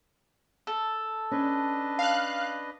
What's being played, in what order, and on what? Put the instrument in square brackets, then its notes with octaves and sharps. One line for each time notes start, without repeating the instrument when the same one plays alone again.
[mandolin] A4
[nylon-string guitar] C#4 [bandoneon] D4 B4 D#5
[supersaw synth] F5 F#6